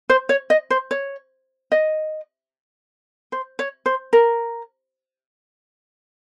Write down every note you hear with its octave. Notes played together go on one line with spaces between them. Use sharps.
C5
C#5
D#5
C5
C#5
D#5
C5
C#5
C5
A#4